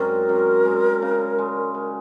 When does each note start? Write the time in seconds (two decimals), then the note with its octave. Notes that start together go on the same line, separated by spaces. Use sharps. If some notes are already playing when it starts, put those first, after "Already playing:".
Already playing: F#2 G#3 C4 A#4
0.29 F#2
0.65 G#3
1.02 C#3
1.38 G#3
1.74 G#3